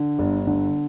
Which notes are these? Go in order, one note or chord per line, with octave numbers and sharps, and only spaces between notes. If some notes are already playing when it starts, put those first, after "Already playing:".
Already playing: D3
G1
D3